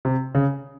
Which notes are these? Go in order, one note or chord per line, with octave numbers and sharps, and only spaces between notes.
C3
C#3